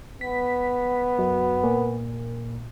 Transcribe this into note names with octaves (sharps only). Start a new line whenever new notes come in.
B3 B6
F#2
A#2